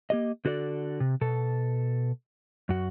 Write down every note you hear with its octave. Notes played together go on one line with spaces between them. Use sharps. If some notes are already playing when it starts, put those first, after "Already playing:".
A#3 G4 D#5
D3 F#4 A4 C#5 D5
C3
B2 A4
F#2 F#4